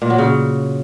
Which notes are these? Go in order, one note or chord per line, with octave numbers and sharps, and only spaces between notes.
A#2
F#3
C#3